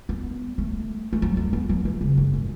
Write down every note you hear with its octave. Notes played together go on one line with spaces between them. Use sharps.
B3
A3
A3
F#3
A3
B3
F#3
E3
C#3
F#2
A2